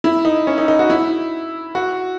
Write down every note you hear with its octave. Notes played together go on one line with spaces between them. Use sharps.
E4
D#4
C#4
D#4
D#4
F#4
E4
F#4